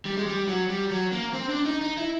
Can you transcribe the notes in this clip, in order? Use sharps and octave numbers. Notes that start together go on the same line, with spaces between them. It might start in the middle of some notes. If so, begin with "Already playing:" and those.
G3
G#3
G3
F#3
G3
F#3
A#3
C4
D4
D#4
D#4
E4